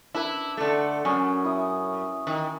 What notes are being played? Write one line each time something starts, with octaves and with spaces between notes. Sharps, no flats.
D4 E4 B4
D3 A3
F#2 C#4
E4 D#6
D#3